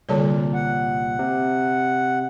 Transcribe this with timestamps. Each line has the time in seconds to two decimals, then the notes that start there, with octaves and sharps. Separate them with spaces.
0.09 C2 A#2 D3 G3 C#5
0.54 F#5
1.19 C3